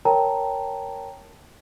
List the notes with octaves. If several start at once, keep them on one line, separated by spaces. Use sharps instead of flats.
A#4 C#5 G5 A5 A#5